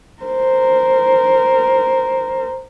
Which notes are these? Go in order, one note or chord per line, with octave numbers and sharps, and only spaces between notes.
A#4 C5